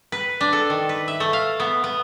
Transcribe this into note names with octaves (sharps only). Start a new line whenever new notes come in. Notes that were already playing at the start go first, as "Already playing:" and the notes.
B4
D4
A4
D#3
B4
E5
A3
F5
B3
B3